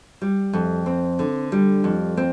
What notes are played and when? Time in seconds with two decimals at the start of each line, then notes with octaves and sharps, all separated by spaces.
0.22 G3
0.53 F2
0.86 C4
1.19 D3
1.52 G3
1.84 F2
2.17 C4